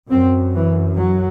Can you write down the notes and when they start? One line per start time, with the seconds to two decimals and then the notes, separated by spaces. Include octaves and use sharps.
0.11 F#2 C4
0.54 E3
0.97 F#3